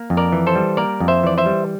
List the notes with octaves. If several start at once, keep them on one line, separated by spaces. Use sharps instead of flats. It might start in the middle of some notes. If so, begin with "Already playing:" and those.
Already playing: A#3
F2
A#4 D5
E3
A4 C5
G3
A#3 A#4 D5
F2
C5 E5
E3 D5
C5 E5
G3